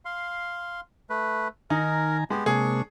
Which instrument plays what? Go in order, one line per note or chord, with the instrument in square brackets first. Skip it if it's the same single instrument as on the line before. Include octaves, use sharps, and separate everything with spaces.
[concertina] F5 C6
A3 B4
[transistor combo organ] D#3 G#5 A#5 [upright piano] D#4 [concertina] A#4
[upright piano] G#3 [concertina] B3 G4
[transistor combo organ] C3 G#3 A#3 [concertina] D4 C#6 [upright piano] G#4